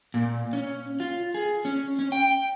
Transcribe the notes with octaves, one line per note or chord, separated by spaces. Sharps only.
A#2
C#4
F4
G#4
C#4
C#4
G5